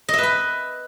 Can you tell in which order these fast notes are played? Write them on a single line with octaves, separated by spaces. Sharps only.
D#5 E5 B4 B5